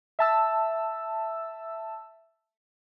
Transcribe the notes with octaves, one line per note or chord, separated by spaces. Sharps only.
E5 A5 E6